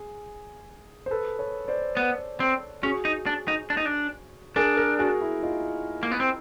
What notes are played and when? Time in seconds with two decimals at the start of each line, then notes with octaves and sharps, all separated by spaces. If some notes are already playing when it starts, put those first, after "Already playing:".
Already playing: G#4
1.06 C5
1.11 A4 B4
1.39 B4 C#5
1.68 C5 D5
1.97 B3
2.40 C4
2.83 C#4 F#4 G#4
3.05 D#4
3.26 D4
3.48 D#4
3.70 D4
3.77 D#4
3.85 D4
4.56 D4 G#4 A#4
4.77 G#4 A#4
4.99 F#4 G#4
5.21 E4 F#4
5.43 D#4 F4
6.03 A#3
6.11 B3
6.20 C4